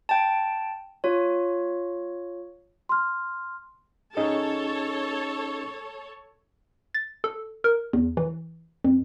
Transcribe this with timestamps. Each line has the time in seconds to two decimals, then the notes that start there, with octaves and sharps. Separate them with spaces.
0.09 G5 A5
1.04 F4 C#5
2.89 C6 F6
4.17 C#4 D#4 G#4 A4 C#5
6.94 A6
7.24 A4
7.64 A#4
7.93 E2
8.17 E3
8.84 F2